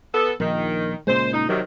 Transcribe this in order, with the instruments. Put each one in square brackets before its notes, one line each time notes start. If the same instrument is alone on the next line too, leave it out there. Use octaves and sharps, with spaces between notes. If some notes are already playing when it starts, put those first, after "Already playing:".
[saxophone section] B3 A4
[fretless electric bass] A#1 [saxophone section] D#3
[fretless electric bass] A#2 C#3 G#3 [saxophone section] C5
[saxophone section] D#4
[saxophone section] C3 D#3 [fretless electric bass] F#3